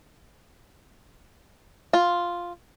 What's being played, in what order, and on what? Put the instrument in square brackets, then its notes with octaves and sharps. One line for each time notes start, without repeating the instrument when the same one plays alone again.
[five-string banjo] F4